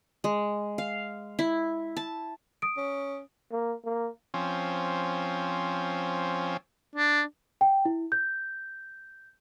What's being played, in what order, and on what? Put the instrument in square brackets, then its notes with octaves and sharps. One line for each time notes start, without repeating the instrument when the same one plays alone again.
[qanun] G#3
F5
E4
A5
[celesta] D#6 D7
[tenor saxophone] C#4
[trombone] A#3
A#3
[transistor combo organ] F3 C4 C#4
[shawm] D4
[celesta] G5
E4
G6